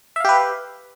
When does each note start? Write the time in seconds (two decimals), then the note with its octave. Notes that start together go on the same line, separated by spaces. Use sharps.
0.16 E5
0.20 F5
0.25 G4
0.29 B4